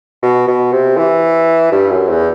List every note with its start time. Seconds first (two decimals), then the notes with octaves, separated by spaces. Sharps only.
0.23 B2
0.48 B2
0.72 C3
0.98 E3
1.72 G2
1.91 F#2
2.09 E2